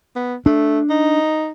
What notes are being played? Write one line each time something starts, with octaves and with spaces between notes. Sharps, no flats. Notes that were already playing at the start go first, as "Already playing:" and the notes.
B3
A3 D4
D#4